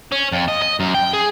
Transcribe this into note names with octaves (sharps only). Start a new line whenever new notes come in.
C#4
F2
D#5
D#5
F#2
G5
G#4